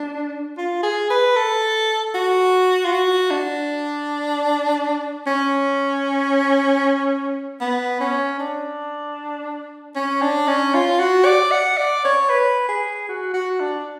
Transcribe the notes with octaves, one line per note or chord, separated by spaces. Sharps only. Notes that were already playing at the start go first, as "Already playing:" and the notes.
Already playing: D4
F4
G#4
B4
A4
F#4
F4
F#4
D4
C#4
B3
C#4
D4
C#4
D4
C#4
F4
F#4
D5
F#5
D5
C#5
B4
G#4
F#4
F#4
D4